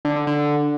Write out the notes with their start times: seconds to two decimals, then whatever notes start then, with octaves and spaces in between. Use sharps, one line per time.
0.05 D3
0.16 D3
0.27 D3